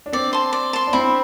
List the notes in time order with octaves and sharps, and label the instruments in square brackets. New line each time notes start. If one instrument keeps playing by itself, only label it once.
[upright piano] D4
[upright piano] C4 [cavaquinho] D5
[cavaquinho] A5 C6
D5
A5 C6
[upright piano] D4
[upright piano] C4 [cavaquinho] E4